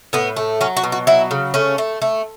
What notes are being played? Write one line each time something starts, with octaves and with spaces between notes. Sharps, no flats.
A2 B3
A3
F#3 C#4
F#4
B2
F#4
F#3 E4
C#3
A3 C#4
A3
A3